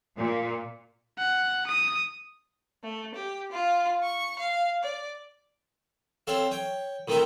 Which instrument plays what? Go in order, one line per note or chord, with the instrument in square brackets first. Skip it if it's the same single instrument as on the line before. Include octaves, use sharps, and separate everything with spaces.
[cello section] A#2
[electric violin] F#5
D#6
[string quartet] A3
G4
F4
C#6
F5
D5
[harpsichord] C4 A4 C#5 F5
C#5 G5
A2 D#3 C4 D#4 A#4 E5